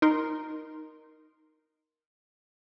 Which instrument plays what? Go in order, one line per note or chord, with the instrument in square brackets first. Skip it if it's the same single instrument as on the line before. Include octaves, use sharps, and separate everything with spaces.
[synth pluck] D#4 A#4 C6